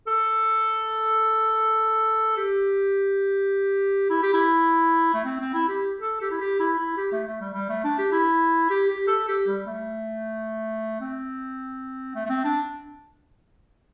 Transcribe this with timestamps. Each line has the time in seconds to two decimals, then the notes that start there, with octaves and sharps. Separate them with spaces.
0.07 A4
2.37 G4
4.10 E4
4.22 G4
4.34 E4
5.14 A3
5.25 C4
5.40 C4
5.54 E4
5.68 G4
6.01 A4
6.21 G4
6.31 E4
6.40 G4
6.60 E4
6.79 E4
6.97 G4
7.12 A3
7.27 A3
7.41 G3
7.54 G3
7.69 A3
7.84 D4
7.99 G4
8.12 E4
8.70 G4
8.90 G4
9.08 A4
9.28 G4
9.47 G3
9.66 A3
11.01 C4
12.15 A3
12.25 A3
12.29 C4
12.44 D4